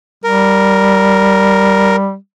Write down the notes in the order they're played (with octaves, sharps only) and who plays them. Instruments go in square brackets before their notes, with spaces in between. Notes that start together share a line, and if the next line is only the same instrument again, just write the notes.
[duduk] G3 [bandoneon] A#4